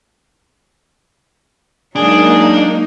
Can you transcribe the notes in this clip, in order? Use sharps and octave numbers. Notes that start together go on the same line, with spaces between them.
F#3 G#3 A#3 D4 D#4 G#4